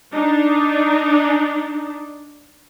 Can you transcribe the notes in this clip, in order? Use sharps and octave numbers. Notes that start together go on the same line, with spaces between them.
D4 D#4